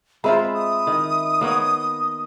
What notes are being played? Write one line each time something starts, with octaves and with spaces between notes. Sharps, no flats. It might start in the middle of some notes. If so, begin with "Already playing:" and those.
G#3 C4 F4 E5 A#5 B5
D#6
D#3
A#3 B3 C#5 D#5